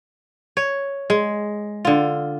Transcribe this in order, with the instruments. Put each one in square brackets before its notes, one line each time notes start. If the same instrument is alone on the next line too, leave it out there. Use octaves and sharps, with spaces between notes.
[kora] C#5
G#3
D3 F4